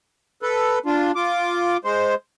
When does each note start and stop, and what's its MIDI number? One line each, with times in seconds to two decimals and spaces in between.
0.42 0.79 69
0.42 0.79 71
0.86 1.12 62
0.86 1.12 65
1.15 1.77 65
1.15 1.77 86
1.84 2.15 56
1.84 2.15 72